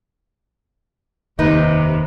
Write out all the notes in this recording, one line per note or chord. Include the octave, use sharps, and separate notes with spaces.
F1 D#2 C3 D#3 D#4 B4